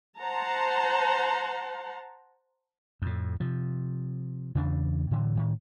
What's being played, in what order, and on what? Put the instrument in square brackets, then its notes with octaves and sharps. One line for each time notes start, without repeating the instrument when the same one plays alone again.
[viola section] C5 F#5 A5 A#5
[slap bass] F2 A2
C3 F3
E2 C#3 E3 D4
A2 D3 E3
A2 D#3